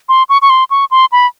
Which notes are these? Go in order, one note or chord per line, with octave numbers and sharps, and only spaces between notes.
C6
C#6
C#6
C6
C#6
C6
B5